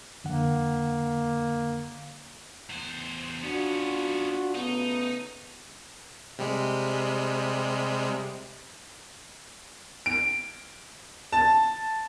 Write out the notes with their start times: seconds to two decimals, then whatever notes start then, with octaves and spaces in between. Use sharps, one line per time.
0.24 F2 D3 A#3 F#5
2.70 E2 C5
3.44 B3 C#4 D4 F4 F#4
4.55 C#3 A3 B3 D#4
6.39 C3 G3 G#3
10.06 D7
11.33 A5